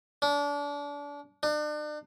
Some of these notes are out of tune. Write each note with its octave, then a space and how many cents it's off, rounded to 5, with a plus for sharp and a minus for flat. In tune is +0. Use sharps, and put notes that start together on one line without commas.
D4 -30
D4 +40